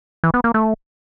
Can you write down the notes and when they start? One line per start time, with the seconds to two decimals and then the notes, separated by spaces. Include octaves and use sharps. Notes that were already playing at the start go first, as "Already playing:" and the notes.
0.24 E3
0.34 B3
0.44 A#3
0.54 A3